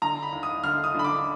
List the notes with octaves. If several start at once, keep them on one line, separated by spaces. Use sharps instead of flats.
D3 A#5
B5
D#2
D#6
D3 F6
D#6
D3 B5
D6